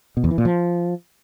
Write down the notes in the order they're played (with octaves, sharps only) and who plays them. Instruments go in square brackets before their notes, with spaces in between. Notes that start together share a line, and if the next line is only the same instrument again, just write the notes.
[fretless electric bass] B2
E2
E3
A#2
F3